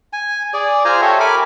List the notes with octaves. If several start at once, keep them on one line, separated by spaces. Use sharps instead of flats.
G#5
G#4 D5
F4 C5 G#5 A#5
G4 A4 C#5 E5
A#4 G#5 B5 D6